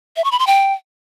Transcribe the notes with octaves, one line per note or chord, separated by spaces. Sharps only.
E5
C#6
B5
C6
G5